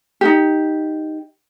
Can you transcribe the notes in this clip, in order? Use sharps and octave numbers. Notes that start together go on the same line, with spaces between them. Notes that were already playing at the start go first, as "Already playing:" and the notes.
D#4 G4